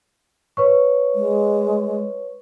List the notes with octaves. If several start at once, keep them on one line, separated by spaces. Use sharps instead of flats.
B4 C#5 C#6
G#3